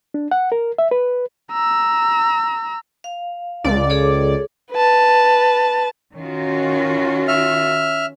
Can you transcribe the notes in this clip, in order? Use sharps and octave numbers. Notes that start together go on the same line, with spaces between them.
D4
F#5
A#4
E5
B4
A#5 E6
F5
C#2 D5
G#4 A4 C#5
B4 A5
D#3 C#4 F4 F#4
E5 F6